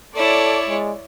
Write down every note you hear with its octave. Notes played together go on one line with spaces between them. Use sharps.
E4 A4 C#5 D5
G#3